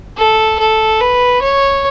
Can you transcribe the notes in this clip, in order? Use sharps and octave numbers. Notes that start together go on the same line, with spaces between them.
A4
A4
B4
C#5